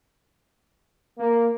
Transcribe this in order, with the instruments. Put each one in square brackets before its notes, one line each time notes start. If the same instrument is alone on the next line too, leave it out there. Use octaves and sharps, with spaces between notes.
[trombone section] A#3